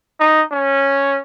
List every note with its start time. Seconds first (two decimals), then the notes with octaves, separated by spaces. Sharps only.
0.20 D#4
0.52 C#4